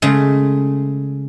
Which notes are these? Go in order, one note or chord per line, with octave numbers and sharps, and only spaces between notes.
C#3 G#3 A3